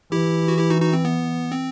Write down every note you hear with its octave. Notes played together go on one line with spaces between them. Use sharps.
E3 E4 G4
F#4
E4 G4
D#4 F#4
D#4 F#4
C4
B3
C4